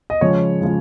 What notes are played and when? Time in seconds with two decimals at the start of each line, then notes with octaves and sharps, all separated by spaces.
0.10 D#5
0.21 C#3 F3 G#3 C#5
0.61 C#3 F3 G#3